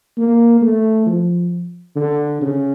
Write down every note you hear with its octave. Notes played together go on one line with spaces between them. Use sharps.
A#3
A3
F3
D3
C#3